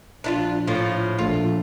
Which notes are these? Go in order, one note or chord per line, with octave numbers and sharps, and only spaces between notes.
A#1 D4 E4 F4
A2 F3 F4
A#1 A3 F4